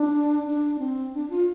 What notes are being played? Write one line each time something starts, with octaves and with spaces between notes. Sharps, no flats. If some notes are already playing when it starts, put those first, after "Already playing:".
Already playing: D4
D4
C4
D4
F4